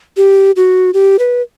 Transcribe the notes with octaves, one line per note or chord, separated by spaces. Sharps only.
G4
F#4
G4
B4